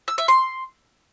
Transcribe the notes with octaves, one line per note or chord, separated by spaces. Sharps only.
E6
E5
C6